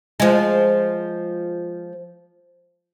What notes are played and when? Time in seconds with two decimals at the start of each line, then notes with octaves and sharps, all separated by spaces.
0.20 F3 G#3